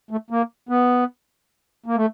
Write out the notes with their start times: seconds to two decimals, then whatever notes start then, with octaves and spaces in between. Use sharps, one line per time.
0.11 A3
0.30 A#3
0.69 B3
1.86 A#3
1.96 A3